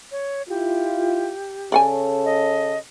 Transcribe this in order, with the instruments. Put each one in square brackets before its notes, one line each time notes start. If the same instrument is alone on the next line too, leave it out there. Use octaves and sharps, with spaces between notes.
[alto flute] C#5
[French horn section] E4 F4 [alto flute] G4
[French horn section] C#3 A4 C#5 [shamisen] D5 F#5 G#5
[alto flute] D#5